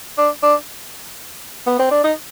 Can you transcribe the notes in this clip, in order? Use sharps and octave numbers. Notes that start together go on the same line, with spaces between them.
D4
D4
B3
C4
D4
D#4